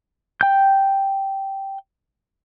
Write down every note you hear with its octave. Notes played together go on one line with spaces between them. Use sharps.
G5 G6